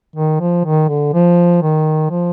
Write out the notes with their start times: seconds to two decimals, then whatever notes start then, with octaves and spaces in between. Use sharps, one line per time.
0.16 D#3
0.40 F3
0.65 D#3
0.89 D3
1.13 F3
1.62 D#3
2.10 F3